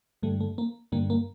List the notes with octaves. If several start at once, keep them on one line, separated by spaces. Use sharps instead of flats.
G2 D3 G3 A3
A3
A#3
G2 D3 G3 A#3
A#3